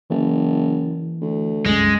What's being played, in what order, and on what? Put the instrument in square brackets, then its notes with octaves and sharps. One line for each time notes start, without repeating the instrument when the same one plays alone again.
[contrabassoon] F#1 [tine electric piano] E3
[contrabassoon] D2
[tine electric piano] C2 F#2 [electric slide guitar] G#3